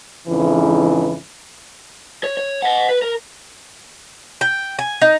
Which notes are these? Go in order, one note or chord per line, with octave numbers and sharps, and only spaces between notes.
F2 G#2 C#3 E3
C#5
C#5
D#5 F#5
B4
A#4
G5
G#5
D#4